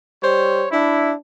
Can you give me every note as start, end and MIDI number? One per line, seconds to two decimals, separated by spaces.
0.23 0.67 55
0.23 0.67 72
0.23 0.67 73
0.71 1.14 62
0.71 1.14 64